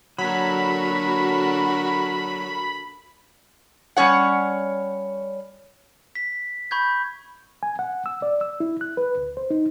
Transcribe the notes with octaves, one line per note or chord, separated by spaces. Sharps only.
D3 F#3 A#3 D4 F#4 A4 A#4 B5
G3 C#4 C#5 F#5
B6
B5 C#6 G6 G#6
G#5
F#5
E6
D5
E6
E4
F#6
B4
D2
C5
D#4